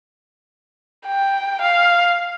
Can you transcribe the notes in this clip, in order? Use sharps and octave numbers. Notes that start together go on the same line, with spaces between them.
G5
F5